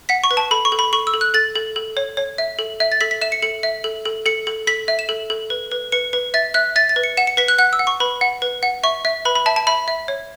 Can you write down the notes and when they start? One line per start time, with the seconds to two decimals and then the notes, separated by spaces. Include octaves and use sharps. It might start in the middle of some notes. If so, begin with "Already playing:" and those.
0.09 F#5 B6
0.24 C#6
0.31 B4
0.37 A5
0.51 A4 B5
0.65 C#6
0.72 A4
0.79 B5
0.93 A4 C#6
1.07 E6
1.14 A4
1.21 F#6
1.34 A4 A6
1.55 A4
1.76 A4
1.97 C#5
2.17 C#5
2.38 E5
2.59 A4
2.80 E5
2.92 A6
3.01 A4 B6
3.11 B6
3.21 E5 E7
3.32 C#7
3.42 A4 C#7
3.63 E5
3.84 A4
4.05 A4
4.26 A4 C#7
4.47 A4
4.67 A4 B6
4.88 E5
4.99 E7
5.09 A4
5.30 A4
5.50 B4
5.71 B4
5.92 B4 C#7
6.13 B4
6.34 E5 A6
6.54 E5 F#6
6.76 E5 A6
6.89 A6
6.96 B4
7.03 C#7
7.17 F#5 E7
7.27 C#7
7.37 B4 B6
7.48 F#6
7.59 F#5 F#6
7.73 E6
7.79 F#5
7.87 C#6
8.00 B4 B5
8.21 F#5
8.42 B4
8.63 F#5
8.83 E5 C#6
9.05 E5
9.25 B4 B5
9.35 B5
9.46 E5 A5
9.56 A5
9.67 E5 B5
9.88 E5
10.08 C#5